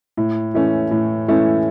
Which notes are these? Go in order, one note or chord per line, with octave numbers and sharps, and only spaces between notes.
A2
E3 A3 C#4
A2
E3 A3 C#4